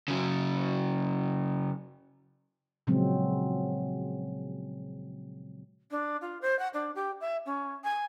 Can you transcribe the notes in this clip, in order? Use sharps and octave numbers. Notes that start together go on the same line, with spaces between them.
C#3 F#3
A#2 C#3 F3 F#3 G#3 C4
D4
F4
C5
F#5
D4
G4
E5
C#4
G#5